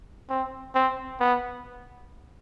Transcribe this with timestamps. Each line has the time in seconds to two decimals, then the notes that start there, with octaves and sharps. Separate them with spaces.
0.29 C4
0.75 C4
1.20 B3